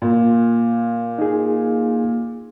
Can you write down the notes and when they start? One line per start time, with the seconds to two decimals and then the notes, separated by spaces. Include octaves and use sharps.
0.02 A#2
1.19 D#4 G#4